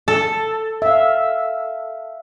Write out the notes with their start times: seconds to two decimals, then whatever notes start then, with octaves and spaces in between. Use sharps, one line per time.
0.08 A4
0.82 E5 F5